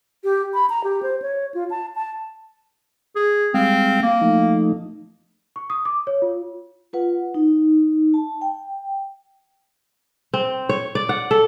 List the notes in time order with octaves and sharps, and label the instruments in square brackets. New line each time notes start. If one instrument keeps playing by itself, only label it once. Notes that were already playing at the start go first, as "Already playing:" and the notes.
[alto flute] G4
B5
A#5
G4
C5
C#5
F4
A5
A5
[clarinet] G#4
[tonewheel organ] G3 G#3 F5 [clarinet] C4
[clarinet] A#3
[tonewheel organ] F3 A3 D#4
[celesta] C#6
D#6
D6
C#5
F4
[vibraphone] F4 B4 F#5
D#4
A5
G5
[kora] C4
C#5
D5
F#5
A4